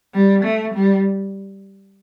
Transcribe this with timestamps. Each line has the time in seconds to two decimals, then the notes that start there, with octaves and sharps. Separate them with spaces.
0.14 G3
0.44 A3
0.74 G3